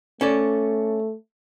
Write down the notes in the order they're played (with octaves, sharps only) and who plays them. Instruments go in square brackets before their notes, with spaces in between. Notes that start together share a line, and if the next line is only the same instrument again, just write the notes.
[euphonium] A3 [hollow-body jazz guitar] C#4 A4 D5